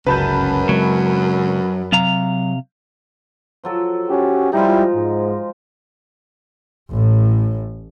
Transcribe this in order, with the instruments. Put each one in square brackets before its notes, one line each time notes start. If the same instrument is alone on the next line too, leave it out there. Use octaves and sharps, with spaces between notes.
[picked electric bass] G1 C#2 C#3 [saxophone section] F#2 [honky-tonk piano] B4 A5 G6
[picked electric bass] C#3 G#3 C4 [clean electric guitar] F#3
[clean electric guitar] C3 F5 A#5 [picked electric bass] F#3
[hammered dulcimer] F3 F#3 A4
[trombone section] C#4 F#4 G4
[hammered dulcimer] F3 G#3 D#4 [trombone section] G3 E4 G4
[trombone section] G#2
[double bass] A1 A2